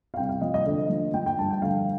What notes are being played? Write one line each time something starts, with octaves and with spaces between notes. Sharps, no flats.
F5
C2 G5
F5
F3 D#5
D#5
D2 D#5
F3
F3 G5
G5
G2 A5
G5
D2 F5